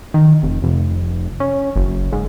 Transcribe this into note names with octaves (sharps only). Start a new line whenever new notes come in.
D#3
F1
F1
C#4
F#1
G#2